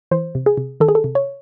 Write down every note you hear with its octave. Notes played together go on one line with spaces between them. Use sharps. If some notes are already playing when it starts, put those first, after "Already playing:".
E3 C5
C3
G#4
C3
D#3 A4
G#4
A4
C3
C#5